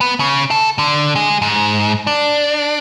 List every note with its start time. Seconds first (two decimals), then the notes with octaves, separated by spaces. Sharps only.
0.01 B3
0.20 C#3
0.51 A4
0.79 D3
1.16 G#3
1.42 G#2
2.07 D4